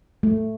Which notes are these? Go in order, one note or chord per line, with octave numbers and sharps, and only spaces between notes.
A3